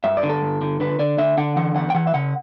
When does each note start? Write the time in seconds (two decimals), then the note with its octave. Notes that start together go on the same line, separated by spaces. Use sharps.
0.04 G2 E5
0.17 D5
0.23 D3
0.30 A4
0.42 G2
0.61 D3
0.80 D3 B4
0.99 D3 D5
1.18 D3 E5
1.38 D3 F#5
1.56 E3 F#5
1.75 E2 F#5
1.90 G5
1.95 E3 F#5
2.07 E5
2.14 C#3 F#5